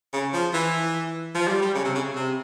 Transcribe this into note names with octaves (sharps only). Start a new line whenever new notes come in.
C#3
F3
E3
F3
G3
G3
C#3
C3
C#3
C3